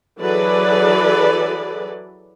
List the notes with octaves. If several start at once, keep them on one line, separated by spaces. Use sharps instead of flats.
E3 F#3 G#4 A4 B4 D5